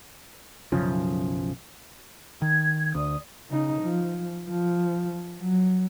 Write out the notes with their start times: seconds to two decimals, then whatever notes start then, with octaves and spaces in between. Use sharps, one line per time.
0.72 B1 F#2 C#3 F3
2.42 D#3 G#6
2.95 D2 D5 D#6
3.50 C#3 D#4
3.82 F3
4.49 F3
5.41 F#3